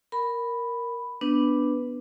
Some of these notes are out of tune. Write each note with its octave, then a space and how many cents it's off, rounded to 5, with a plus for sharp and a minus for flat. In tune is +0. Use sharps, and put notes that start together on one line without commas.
A#4 +0 B5 +0
B3 +0 D4 +0 B4 +0